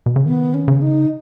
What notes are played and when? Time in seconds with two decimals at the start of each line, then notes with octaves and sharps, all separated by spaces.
0.06 B2
0.16 C#3
0.26 D#3 B3
0.54 C#4
0.68 C#3
0.81 D#4